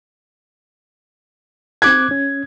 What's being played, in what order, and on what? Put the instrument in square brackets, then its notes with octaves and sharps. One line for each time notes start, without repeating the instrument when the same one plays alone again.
[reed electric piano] C4 D6 F#6 [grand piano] G#6
[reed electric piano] C#4